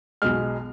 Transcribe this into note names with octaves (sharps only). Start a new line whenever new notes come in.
B1 B2 G#3 F6